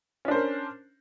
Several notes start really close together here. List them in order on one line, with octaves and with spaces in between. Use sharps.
C#4 D4 C5 A#4